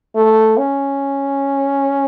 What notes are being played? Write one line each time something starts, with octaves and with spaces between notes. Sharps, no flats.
A3
C#4